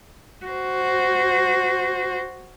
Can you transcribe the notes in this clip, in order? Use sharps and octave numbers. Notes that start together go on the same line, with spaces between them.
F#4 C5